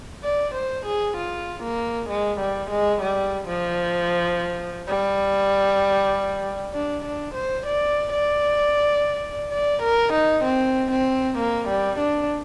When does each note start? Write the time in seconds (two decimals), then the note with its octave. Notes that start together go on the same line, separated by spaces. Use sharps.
0.24 D5
0.55 C5
0.86 G#4
1.17 F4
1.63 A#3
2.09 G#3
2.40 G3
2.71 G#3
3.02 G3
3.48 F3
4.88 G3
6.74 D4
7.05 D4
7.35 C5
7.67 D5
8.13 D5
9.52 D5
9.83 A#4
10.13 D#4
10.44 C4
10.92 C4
11.38 A#3
11.69 G3
11.99 D4